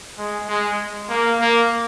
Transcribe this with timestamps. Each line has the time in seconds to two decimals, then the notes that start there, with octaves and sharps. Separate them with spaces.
0.18 G#3
0.48 G#3
1.09 A#3
1.40 A#3